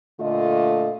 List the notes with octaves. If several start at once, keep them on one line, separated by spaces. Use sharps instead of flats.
A#2 D3 A3 F4 D#5